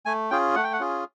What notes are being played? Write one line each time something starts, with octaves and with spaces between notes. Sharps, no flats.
A3 G#5
C#4 F4 G#4 G5
A3 F#5
G5
F#5
C#4 F4 G#4